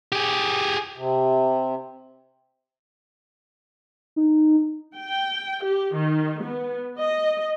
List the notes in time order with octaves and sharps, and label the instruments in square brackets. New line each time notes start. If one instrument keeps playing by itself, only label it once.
[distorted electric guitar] G4 G#4
[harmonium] C3
[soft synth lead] D#4
[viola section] G5
G4
D#3
B3
D#5